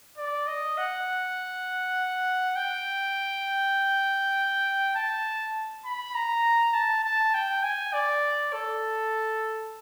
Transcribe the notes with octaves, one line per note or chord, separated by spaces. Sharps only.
D5
D#5
F#5
G5
A5
B5
A#5
A5
A5
G5
G#5
D5
A4